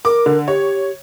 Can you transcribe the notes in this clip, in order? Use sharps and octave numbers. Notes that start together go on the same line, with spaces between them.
A#4 D6
D3
G4 C#5